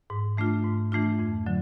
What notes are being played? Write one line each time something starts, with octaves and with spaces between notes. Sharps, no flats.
G#2
E3 A3 D4 F4
G#2
E3 A3 D4 F4
F2
D3 F#3